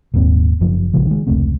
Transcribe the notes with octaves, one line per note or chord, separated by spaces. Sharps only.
D#1 D#2 G#2 C4
F#1 F#2 F3
A#1 C#3 F3 G#3
D#3 G#3
F1 C#2 A3 C4